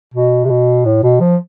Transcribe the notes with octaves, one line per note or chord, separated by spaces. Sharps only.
B2
C3
B2
A2
B2
F3